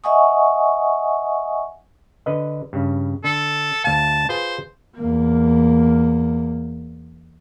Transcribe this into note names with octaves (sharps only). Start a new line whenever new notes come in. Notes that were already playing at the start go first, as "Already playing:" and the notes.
D#5 E5 F#5 G#5 C#6 D#6
D3 B4 D#5
G2 C#3
D3 A4
D2 F5 A5
F4 G#4 B4 C5
E2 A#3